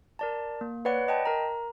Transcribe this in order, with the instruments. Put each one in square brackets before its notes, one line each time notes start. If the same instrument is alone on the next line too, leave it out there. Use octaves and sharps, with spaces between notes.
[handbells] A#4 D5 A5
A#3
B4 C#5 D5 F#5 B5
D#5 G5 A5
A#4 A#5